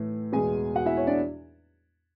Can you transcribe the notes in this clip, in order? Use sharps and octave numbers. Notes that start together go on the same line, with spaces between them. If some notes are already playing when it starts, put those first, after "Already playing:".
Already playing: A2 E3 A3
E2 B2 G#3 B3 G#4 G#5
F#4 F#5
E4 E5
C#5
D4 D5